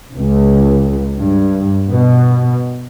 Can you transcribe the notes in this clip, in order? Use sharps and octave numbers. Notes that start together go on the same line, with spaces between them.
C#2
G2
B2